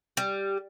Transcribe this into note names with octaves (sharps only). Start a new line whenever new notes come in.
G3